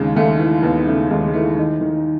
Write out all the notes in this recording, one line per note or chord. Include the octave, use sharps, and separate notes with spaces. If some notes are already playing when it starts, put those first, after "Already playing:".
Already playing: D#2 C#3 G#3
D#2 A3
E3
D#2 B3
C#3 A3
D#2 G#3
G#3
E3 A3
D#3 D#4
D#3